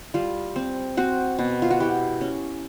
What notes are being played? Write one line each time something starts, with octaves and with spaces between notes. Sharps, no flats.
G3 F4
C4
C4 F#4
B2
F4
F#4
E4 G4
C#4